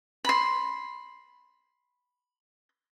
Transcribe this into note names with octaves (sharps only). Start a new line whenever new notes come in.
B5 C6